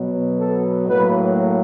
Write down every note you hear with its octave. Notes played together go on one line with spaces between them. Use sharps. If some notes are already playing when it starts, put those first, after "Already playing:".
Already playing: B2 F#3 B3
A4
A2 F#3 A#3 B4